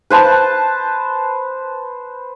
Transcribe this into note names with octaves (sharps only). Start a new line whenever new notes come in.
B4 C5 A5